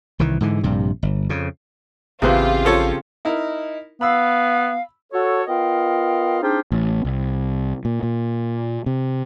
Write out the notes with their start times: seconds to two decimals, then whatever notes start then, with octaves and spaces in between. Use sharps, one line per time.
0.19 C2 D#3 E3
0.41 G#2 D3 E3
0.64 A#1 G2 C3
1.03 G1
1.29 F2 C#3
2.22 A1 E2 C#3 C4 F4 G4 B4
2.65 F3 A4 C#5
3.25 D#4 E4 A#4
4.01 B3 F5 B5 E6
5.12 F#4 A4 C#5
5.47 B3 F4 A#4 D#5 F5 G5
6.42 C4 D4 D#4 F4 G4 G#4
6.72 A1
7.05 C2
7.85 A#2
8.03 A#2
8.86 C3